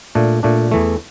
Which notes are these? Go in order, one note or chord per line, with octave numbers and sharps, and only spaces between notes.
A#2 A3 D4
A#2 A3 D4
E2 E3 A3